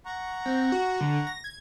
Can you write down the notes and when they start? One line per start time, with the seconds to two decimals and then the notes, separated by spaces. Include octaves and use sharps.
0.06 F#5 A#5 C#6
0.46 C4
0.72 F#4
1.01 D3
1.27 A#6
1.44 G#6